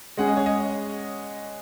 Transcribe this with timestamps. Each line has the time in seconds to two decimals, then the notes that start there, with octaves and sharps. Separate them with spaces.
0.17 G#3 C#4 G#4 F#5
0.28 D#5
0.37 C#5
0.46 D#5